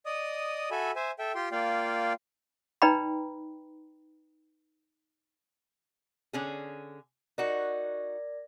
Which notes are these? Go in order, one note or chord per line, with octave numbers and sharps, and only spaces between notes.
D5 D#5 D#6
F#4 A4 E5 G#5 B5
C5 E5 G#5
A4 E5 G5
F4 G4 G5 C6
A#3 F4 D5 F5 G5
D#4 B4 D5 G5 A#5 B5
D3 C#4 G#4
D#4 F#4 A#4 D5 A#6